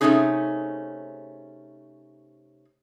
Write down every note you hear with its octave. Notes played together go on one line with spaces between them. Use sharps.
C3 G3 A3 C#4 D#4 G#4